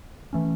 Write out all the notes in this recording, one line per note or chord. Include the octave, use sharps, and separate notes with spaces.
E3 A3 C#4